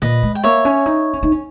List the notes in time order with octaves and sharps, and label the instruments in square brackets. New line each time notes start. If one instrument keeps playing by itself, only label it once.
[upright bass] A#2 [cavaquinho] B4 D#5
[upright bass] G#3
[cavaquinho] G5
[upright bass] A#3 [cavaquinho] C#5 E5
[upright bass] C#4
D#4
C#4
D#4
C#4